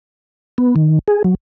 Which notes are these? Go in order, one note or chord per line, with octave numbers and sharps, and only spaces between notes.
B3
D#3
G#4
F#3